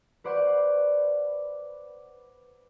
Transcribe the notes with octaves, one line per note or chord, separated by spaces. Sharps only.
B4 C5 D5 F#5 C#6 G6